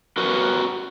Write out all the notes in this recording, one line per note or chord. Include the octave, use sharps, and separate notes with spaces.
F#4 A#4 B4